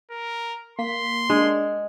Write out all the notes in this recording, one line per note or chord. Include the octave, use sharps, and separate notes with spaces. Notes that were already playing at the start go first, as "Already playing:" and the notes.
A#4
A#3 C6 B6
G#3 D4